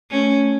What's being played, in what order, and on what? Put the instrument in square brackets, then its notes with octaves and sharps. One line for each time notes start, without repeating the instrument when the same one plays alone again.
[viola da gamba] A3 C#4